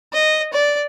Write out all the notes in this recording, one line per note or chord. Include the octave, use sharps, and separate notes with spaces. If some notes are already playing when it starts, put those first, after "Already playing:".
D#5
D5